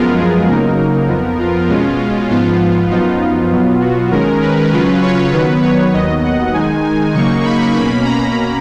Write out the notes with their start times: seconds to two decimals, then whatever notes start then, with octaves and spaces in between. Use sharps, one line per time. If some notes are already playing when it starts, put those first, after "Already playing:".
Already playing: F#2 F3 G#3 B3 F4 A#4
0.17 G#4
0.48 C#3 F#3 A#3 D#4 A#4
1.08 F2 F3 B3
1.39 F4
1.69 B2 G#3 C#4 F4
2.30 G#2 F3 B3 F4
2.90 F#2 F3 B3 D#4 F4
3.51 B2 F#3 B3
3.81 F#4
4.11 D#3 G#3 C#4 A#4
4.42 B4
4.72 C#3 F#3 C#4 F4
5.02 C#5
5.33 D#3 F#3 B3 B4
5.63 C#5
5.93 D#2 D#3 F#3 B3 D#5
6.24 F#5
6.54 D#3 G#3 D#4 G#5
6.84 G#5
7.14 C#3 F#3 A#3 D#4 C#6
7.45 B5
7.75 B2 A#3 C#4 B5
8.05 A#5